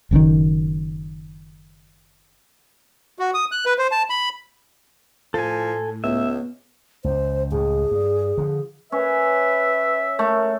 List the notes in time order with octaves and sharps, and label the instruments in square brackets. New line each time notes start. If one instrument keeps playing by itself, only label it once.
[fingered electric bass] F#1 F#2 C3 D#3
[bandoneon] F#4
D#6
F#6
B4
C5
A5
B5
[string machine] A2 [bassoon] F3 [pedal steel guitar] A4 G#5
[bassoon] C#2 [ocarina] B3 [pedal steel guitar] E5
[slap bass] C#2 [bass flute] C5
[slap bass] C#2 A2 [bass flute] G#4
[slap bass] G2
D3 F3
[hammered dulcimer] C#4 [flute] B4 [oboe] E5
[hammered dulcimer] A3 [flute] A#4